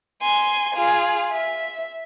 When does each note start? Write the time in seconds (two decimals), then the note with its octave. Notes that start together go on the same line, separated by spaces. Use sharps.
0.22 G#5 C6
0.76 F4 G#4
1.33 E5